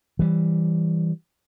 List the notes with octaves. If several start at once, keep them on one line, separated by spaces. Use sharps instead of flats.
E3 G3